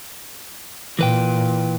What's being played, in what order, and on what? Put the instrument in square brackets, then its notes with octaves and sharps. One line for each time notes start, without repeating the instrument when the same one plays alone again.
[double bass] A#2 [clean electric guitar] E3 B4 G5